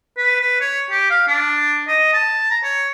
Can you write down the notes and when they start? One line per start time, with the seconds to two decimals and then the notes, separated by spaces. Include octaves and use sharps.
0.18 B4
0.41 B4
0.61 C#5
0.91 G4
1.10 F5
1.27 D4
1.88 D#5
2.13 A5
2.51 A#5
2.64 C#5